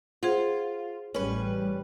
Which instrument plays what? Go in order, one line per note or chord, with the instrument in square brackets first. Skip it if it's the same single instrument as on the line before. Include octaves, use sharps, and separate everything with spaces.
[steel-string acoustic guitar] F4 [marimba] G#4 C5 F#5
[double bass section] A1 A2 G3 [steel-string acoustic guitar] C#4 B4